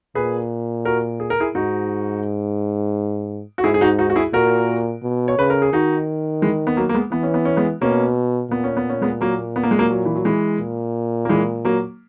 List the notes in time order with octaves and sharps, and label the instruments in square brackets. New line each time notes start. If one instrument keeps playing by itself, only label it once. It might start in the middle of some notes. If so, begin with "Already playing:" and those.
[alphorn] A#2 [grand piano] G#4 B4
[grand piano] F#4 A#4
G#4
A#4
E4 G#4
[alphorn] G#2 [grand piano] D#4 F#4
[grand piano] F#4
[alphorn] G#2 [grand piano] E4 G#4
[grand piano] G#4
D#4 F#4
D#4 F#4
F#4
E4 G#4
[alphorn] A#2 [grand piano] F#4 A#4
[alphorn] B2
[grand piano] C#5
[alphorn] C#3 [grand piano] B4
[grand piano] A#4
G#4
[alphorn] D#3 [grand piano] D#4 F#4
[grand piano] E3 G#3
B3
F#3 A#3
A#3
G#3 B3
[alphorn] E3 [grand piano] B3
[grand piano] C#4
B3
C#4
G#3 B3
[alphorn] B2 [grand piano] A#3 C#4
[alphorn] A#2 [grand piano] B3
[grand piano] C#4
B3
C#4
G#3 B3
F#3 A#3
B3
A#3
G#3
F#3 A#3
F#3
E3
F#3
E3 G#3
[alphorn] A#2
[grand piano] A#3
E3 G#3
F#3 A#3